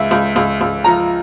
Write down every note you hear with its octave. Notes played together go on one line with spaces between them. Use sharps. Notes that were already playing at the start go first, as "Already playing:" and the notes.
Already playing: C#2 E5
C#2
C#2
C#2
F3 A#5